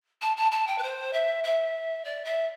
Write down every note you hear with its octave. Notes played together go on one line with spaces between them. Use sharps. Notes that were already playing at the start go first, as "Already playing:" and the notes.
A5
A5
A5
G5
B4
C5
E5
E5
D5
E5